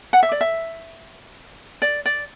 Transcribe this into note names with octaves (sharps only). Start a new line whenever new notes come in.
F#5
E5
D5
E5
D5
D5